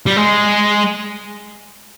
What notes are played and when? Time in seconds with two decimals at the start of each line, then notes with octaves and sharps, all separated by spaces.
0.06 G3
0.16 G#3